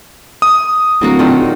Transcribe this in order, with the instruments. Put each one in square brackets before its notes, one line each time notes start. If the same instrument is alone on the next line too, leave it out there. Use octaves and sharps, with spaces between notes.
[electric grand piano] D#6
[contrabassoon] D1 [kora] F#3 A#3 F#4
[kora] A#2 D#3 A3